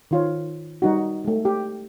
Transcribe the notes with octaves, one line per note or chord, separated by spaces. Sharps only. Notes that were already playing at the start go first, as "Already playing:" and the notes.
D#3 F4 C#5
G3 D#4 F#4
G#3 A3
G4